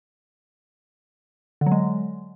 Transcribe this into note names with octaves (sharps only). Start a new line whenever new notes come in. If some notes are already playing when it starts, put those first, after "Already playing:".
D3
F#3
G#3